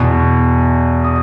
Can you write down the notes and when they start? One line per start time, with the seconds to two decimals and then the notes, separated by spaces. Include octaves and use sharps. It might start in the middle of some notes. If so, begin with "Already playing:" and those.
Already playing: E2 B2
1.04 D#6